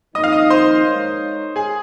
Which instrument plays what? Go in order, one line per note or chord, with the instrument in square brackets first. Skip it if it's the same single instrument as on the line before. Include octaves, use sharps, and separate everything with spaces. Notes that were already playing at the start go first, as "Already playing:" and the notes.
[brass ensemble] F2 D#3 A#3 D#4 [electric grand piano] D#5 D#6
[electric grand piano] F5 F6
D#5 D#6
C5 C6
[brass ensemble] G#3 D#4 A#4 C#5
[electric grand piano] G#4 G#5